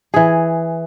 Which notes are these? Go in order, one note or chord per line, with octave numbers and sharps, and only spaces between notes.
E3 G#4